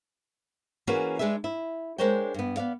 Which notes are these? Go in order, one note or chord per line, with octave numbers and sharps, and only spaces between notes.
E3 A#3 C#4 F#4 G#4 B4
G#3 D4 G#4 B4 E5
E4
G#3 D4 A#4 C5 C#5 G5
G2 B3
B3 D5 F5